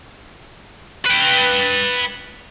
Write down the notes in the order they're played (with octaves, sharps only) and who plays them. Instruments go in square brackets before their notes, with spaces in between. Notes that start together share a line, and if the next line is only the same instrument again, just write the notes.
[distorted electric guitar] B4 G5